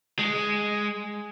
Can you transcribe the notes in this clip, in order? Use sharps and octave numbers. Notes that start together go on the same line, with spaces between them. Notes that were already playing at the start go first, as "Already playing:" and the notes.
G#3